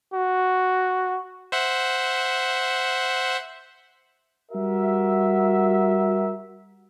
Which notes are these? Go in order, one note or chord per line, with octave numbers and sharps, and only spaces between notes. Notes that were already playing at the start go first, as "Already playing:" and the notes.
F#4
C5 E5 F#5
G3 F#4 A#4 E5